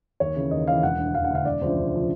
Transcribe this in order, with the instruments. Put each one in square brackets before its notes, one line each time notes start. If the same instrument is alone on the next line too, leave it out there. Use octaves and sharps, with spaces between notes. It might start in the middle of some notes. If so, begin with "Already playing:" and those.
[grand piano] D#2 C#5
C#3 E3
D#2 D#5
C#3 E3 F5
E1 F#5
D2 D3
E1 F5
F#5
D2 D3 F5
E1 D5
D2 C#3 F3 C5
E1
C#3 F3